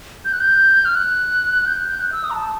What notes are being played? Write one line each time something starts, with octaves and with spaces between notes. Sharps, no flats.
G6
F#6
G6
F6
F#6
G6
F#6
G6
F#6
E6
D#6
A#5
A5